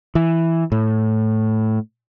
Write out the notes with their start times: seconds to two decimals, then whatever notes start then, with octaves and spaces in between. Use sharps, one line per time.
0.15 E3
0.72 A2